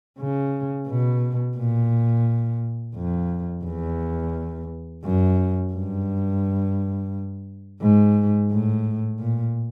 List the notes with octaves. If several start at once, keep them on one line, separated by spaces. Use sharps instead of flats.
C#3
B2
A#2
F2
E2
F#2
G2
G#2
A2
A#2